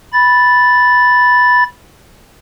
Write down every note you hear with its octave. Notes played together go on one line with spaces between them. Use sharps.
B5 A6